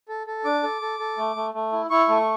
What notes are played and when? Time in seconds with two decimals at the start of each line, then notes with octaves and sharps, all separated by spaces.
0.09 A4
0.27 A4
0.45 D4 D6
0.63 A4
0.82 A4
0.99 A4
1.18 A3
1.36 A3
1.54 A3
1.72 E4
1.90 E4 C#6
2.08 A3